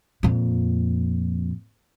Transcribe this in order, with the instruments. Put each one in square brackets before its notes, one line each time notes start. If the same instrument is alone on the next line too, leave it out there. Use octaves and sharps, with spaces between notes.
[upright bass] F2 A#2